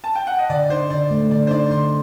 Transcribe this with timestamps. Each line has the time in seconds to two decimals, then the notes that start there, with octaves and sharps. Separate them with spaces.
0.04 A5
0.15 G5
0.27 F#5
0.38 D#5
0.50 D3 D5
0.70 D#4 C5
0.90 D3 D5
1.11 A3
1.31 D3 D5
1.47 C5
1.51 D#4 D5
1.71 D3 C6